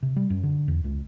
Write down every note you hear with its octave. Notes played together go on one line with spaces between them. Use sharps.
C3
G3
F#2
D3
E2
C#2